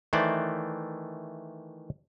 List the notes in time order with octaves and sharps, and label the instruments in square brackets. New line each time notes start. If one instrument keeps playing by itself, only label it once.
[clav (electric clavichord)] D#3 E3 A3 C5 D5